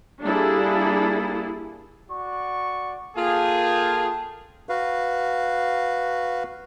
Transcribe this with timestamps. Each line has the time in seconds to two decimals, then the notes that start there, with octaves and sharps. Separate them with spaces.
0.23 G3 A#3 D4 E4 G#4 A4
2.10 F#4 D5 C#6
3.16 A#3 F4 G#4 A4 G5 A5
4.69 F#4 B4 F5